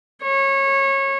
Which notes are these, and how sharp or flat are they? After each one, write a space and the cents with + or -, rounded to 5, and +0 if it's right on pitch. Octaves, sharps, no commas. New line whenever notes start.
C#5 -25